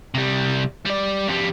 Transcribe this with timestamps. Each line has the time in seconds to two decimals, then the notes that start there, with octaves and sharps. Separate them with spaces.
0.14 C3 G3
0.86 G3 D5
1.29 F2 G3